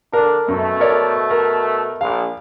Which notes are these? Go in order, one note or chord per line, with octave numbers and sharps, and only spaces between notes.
D3 D4 A#4
F#2 B2 A3
A#4 C#5 D5
A#4
A#1 F5